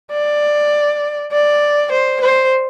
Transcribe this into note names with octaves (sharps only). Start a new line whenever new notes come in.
D5
D5
C5
C5